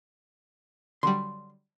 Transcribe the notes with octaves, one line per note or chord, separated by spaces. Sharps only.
D3 F#3 G3 C6